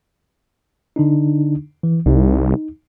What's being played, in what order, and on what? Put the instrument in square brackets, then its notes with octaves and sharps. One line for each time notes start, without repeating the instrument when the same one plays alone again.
[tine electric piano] D3 D4 D#4
E3
[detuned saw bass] C2 [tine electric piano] D#4